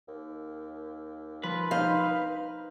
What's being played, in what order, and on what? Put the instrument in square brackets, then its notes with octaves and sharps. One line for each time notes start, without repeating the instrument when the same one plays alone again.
[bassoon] D#2
[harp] F3 [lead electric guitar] B4
[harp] D#4 C5 [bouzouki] F5